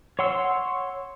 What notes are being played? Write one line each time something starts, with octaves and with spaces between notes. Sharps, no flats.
C#5 F#5 C6 E6